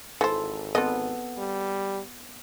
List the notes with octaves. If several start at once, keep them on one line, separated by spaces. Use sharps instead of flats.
G#1 E3 A4 C5
B3 C4 A4 D#5
G3